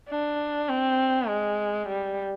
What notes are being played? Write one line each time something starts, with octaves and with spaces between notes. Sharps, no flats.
D4
C4
G#3
G3